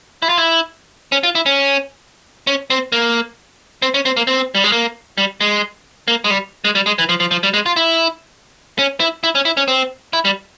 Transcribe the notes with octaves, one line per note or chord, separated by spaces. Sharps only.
E4
F4
E4
C#4
F4
E4
C#4
C#4
C4
A#3
C4
C#4
C4
A#3
C4
G3
G#3
A#3
G3
G#3
A#3
G#3
G3
G#3
G3
G#3
E3
F3
F3
F3
G3
G#3
F4
E4
C#4
E4
E4
C#4
E4
C#4
C4
E4
G3